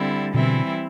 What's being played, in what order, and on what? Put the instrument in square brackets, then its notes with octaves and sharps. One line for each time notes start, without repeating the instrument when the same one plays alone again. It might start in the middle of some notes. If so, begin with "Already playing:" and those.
Already playing: [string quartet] D3 G3 C4 E4
[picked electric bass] B2 D3 [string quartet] E3 G3 C4 E4